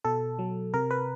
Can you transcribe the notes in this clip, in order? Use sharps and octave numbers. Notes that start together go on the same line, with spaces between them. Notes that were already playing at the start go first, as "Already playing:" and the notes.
B2 A4
F#3
C3 A#4
B4